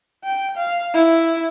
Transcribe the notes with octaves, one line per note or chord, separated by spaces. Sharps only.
G5
F5
E4